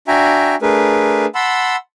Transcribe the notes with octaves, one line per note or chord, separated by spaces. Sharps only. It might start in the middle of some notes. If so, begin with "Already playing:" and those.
D4 F#4 E5 G5 G#5 A#5
A3 D4 G#4 A#4 B4
F#5 A5 B5 C6 E6